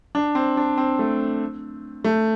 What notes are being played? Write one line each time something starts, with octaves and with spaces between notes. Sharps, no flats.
D4
C4
D4
C4
A3
A3